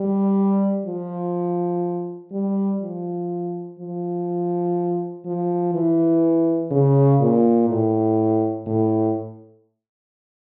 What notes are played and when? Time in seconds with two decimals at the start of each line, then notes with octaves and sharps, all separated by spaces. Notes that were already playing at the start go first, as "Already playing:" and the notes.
Already playing: G3
0.86 F3
2.32 G3
2.82 F3
3.79 F3
5.26 F3
5.75 E3
6.71 C#3
7.21 A#2
7.70 A2
8.67 A2